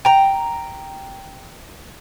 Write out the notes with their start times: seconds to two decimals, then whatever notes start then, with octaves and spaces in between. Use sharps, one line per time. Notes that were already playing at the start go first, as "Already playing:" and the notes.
0.05 G5 A#5